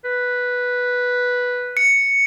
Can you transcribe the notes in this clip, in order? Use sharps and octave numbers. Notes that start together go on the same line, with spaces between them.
B4
C#7